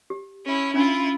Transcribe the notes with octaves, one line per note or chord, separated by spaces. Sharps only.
G4
C#4 E4
C#4 D4 E4 F4